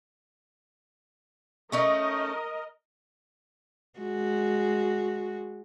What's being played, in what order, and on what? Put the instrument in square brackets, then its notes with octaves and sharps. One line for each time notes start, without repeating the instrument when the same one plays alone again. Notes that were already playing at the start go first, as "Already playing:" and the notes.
[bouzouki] A3 C#4 D#4 [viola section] A#4 D#5
[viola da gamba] G#3 F#4